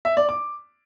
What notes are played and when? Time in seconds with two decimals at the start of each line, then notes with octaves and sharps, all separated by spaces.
0.05 E5
0.17 D5
0.29 D6